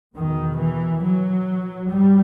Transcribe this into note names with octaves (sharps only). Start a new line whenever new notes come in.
E2 B2 D#3
E3
F#3
G2 G3